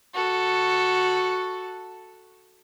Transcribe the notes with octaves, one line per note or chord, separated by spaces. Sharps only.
F#4 A4